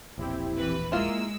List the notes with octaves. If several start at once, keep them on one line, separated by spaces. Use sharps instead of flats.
E1 A#1 C4 E4 G4
E3 B4
G#3 A#3 E4 F4 A#4 E6